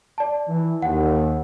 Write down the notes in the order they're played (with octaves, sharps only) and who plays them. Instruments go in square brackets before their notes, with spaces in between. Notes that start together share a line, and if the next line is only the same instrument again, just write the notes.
[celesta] D5 A5
[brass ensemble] E3
[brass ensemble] D#2 [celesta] F#5